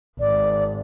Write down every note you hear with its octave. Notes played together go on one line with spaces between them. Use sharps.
G#1 D5